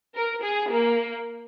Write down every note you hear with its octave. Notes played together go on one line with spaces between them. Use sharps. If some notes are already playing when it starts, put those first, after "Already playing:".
A#4
G#4
A#3